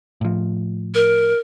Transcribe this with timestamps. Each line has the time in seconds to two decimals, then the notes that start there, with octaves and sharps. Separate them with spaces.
0.21 A2 F3
0.95 A#4